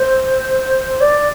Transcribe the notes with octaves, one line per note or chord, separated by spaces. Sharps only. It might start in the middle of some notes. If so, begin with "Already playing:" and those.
Already playing: C5
D5